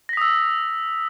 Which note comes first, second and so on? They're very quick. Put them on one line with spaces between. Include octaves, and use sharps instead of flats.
A#6 B6 D#6 E6